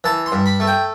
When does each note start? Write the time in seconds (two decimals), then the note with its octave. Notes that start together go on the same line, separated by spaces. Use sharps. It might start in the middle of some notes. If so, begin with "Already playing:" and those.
0.04 E3 A5
0.26 C6
0.32 G2
0.46 B5
0.60 A3
0.67 G5